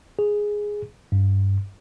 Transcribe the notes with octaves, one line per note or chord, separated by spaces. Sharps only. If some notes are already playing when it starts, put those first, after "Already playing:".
G#4
G2